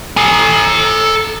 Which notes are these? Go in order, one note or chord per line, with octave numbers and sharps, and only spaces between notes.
A4 G#5